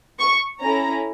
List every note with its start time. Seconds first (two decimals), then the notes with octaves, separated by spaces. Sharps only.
0.19 C#6
0.62 C#4 E4 A4 A#5